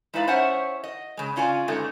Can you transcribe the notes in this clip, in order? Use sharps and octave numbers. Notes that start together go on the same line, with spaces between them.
G#3 D#4 E4 B4 D5 F5
C#4 C5 C#5 E5 F#5
D#5
C#3 G#3
C#3 C#4 F4 D5 G#5
G2 D3 G#3 A3 C#4 D#4